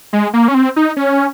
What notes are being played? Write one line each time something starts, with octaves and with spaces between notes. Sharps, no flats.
G#3
A#3
C#4
C4
D#4
C#4